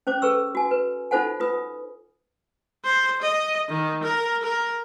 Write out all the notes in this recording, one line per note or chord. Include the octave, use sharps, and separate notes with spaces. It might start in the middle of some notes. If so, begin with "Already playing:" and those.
C#4 C5 D6
G#4 A4 B4 C#6 E6
F#4 G#5
B4
D#4 F4 A4 C5 F#5 G#5
F4 B4 D#6
C5
D#5
D#3
A#4
A#4